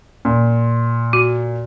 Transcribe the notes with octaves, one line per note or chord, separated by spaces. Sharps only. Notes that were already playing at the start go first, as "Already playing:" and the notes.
A#2
F#4